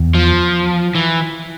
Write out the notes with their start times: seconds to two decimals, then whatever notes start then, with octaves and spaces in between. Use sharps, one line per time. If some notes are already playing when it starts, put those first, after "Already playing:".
Already playing: E2
0.14 F3
0.95 E3